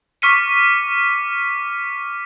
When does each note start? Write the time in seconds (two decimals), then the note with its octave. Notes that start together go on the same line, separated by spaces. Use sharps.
0.22 C#6 D6 F6 B6 C#7 D#7